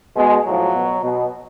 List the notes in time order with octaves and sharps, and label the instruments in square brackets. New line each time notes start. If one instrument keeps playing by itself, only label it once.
[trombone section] B2 G#3
A2 F3 F#3
B2
B2